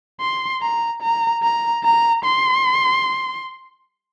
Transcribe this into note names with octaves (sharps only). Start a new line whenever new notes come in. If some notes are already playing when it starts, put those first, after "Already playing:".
C6
A#5
A#5
A#5
A#5
C6